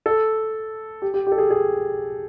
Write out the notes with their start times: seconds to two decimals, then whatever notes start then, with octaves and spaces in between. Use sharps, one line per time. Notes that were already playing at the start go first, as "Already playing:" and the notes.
0.06 A4
1.02 G4
1.14 G4
1.27 G4
1.32 A4
1.38 G#4
1.51 G#4